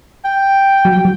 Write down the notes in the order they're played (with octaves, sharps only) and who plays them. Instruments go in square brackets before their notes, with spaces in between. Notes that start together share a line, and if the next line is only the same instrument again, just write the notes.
[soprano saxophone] G5
[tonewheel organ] F#3